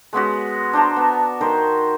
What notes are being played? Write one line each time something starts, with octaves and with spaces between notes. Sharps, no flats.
G#3 B3 C#4 F#4
D4 C5 A5 A#5
B3
D#3 A#4 C5